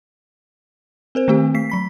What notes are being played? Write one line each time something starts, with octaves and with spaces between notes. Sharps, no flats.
C4 A#4 C5
D#3 A3 C4 G4
A3 B6 C7
F#3 B5 B6